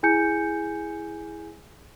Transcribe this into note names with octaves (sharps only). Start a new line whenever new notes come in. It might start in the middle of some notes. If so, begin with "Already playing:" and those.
E4 G#4 G#5 G6 C#7